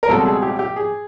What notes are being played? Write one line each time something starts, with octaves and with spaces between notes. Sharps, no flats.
A#4
C#2 B2 G3 C4 A4
G#4
G4
G4
G#4